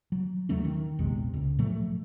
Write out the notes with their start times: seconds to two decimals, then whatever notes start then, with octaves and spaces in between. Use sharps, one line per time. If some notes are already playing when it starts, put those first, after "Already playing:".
0.12 F#3
0.49 D#2 F#3 A3 C#4
0.65 D#3
0.99 A#1 E2 C3 G#3
1.34 C#2
1.59 A2 F3 F#3 A3